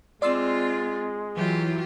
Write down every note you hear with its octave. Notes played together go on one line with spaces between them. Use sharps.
G#3 C4 F4 D5 C6 E6
E3 F#3 F4 G4